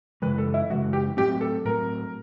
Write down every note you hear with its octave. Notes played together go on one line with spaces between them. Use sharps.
F#2 C#3 E3 G#3 B4
A4
E4
F#2 C#3 E3 G#3 F#4
G4
A2 F#3 A3 C4 G4
A4
A2 F#3 A3 C4 A#4